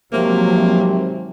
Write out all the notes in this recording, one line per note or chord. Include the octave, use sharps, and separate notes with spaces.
G#1 C3 F3 F#3 A#3